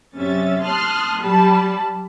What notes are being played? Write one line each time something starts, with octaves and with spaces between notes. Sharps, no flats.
F#2 C3 C#4 E5 A6
A5 C6 D#6 F6 F#6
F#3 G3 A5 B5